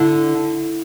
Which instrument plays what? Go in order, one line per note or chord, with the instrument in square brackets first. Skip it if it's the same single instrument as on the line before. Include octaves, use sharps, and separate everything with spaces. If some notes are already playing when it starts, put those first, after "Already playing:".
Already playing: [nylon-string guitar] D3 E4